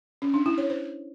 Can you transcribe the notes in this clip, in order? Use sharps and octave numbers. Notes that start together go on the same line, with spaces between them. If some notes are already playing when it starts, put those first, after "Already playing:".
C#4
D4
E4
C#5
C5